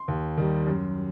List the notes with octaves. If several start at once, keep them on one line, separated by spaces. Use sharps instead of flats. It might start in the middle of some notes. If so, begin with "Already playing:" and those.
Already playing: C6
D#2
D#3 G3
F#2